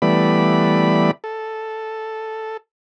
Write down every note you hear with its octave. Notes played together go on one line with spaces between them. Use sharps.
E3 G3 A3 B3 D5 B5
A4